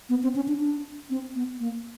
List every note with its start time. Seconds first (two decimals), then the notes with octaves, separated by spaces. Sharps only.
0.09 B3
0.23 C4
0.36 C#4
0.48 D4
0.60 D4
1.10 C4
1.35 B3
1.60 A#3